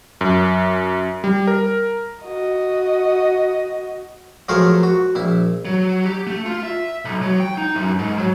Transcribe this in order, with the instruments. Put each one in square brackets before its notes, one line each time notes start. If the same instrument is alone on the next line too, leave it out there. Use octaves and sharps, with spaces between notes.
[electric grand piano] F#2
G3
A#4
[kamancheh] F#4 D#5
[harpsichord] F3 F#3 A3 G#4 A#4 C#5
F#4
A#1 E4
[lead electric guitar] F#3
G4
A3
F4
E5
B1
F#3
G5
D#4
F#2
G#2
F#3